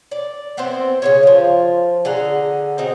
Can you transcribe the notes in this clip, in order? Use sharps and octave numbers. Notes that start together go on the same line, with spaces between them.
D5
B3 C4 E4 C5
C#3 F#3 C#5
F3 F4
D3 G#4 F#5 A#5
C4 D#4 F#4